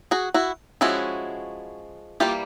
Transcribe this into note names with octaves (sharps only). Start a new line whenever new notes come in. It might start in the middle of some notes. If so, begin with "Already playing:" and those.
F#4 G#4
E4 F#4
F3 G#3 C#4 E4 F#4
E3 G3 A#3 F4 G4